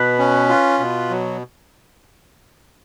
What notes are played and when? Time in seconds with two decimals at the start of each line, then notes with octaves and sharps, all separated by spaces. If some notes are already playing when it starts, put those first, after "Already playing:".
Already playing: B2 B4
0.19 C#4
0.49 F4
0.79 B2
1.10 F#3